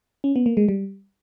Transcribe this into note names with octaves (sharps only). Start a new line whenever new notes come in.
C#4
B3
A#3
G#3
G3